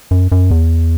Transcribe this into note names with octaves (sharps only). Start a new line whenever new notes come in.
F#2
F#2
E2